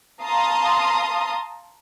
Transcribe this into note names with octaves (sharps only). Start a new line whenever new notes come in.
F5 A5 A#5 C6 D#6